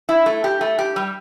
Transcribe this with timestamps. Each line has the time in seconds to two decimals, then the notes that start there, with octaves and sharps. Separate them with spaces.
0.09 E4
0.26 A3
0.44 G4
0.61 A3
0.79 G4
0.96 G3